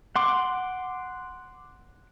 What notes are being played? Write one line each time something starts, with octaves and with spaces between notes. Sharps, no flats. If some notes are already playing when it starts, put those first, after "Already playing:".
F#5 C6 D6